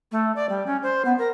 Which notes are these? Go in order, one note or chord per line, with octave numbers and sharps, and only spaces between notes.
A3
D5
G3
C#4
C5
B3
A#4